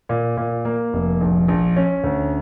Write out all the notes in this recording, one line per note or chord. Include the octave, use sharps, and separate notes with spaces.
A#2
A#2
A#3
F1
A#1
A#1
C#4
D2